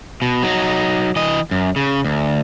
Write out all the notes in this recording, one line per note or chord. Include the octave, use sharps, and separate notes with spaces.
B2
F#3 D#4
E3 D#5
F#2
C#3
D2